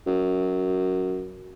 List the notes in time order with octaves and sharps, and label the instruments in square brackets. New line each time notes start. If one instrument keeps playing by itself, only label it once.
[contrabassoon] F#2